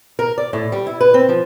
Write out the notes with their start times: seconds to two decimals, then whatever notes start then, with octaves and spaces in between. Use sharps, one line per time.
0.19 A#4
0.38 D5
0.53 A2
0.72 G3
0.87 E4
1.01 B4
1.14 C4
1.29 F3